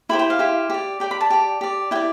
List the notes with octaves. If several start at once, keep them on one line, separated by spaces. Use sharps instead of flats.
E4 G4 C5 B5
G5
F5
E4 G4 C5
G4 D5
G4 D5 G5
B5
A5
G4 D5
G4 D5
E4 G4 D5 G5